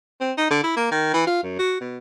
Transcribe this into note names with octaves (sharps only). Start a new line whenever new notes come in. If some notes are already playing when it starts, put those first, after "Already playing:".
C4
D#4
D3
E4
A#3
D#3
E3
F4
F#2
F#4
B2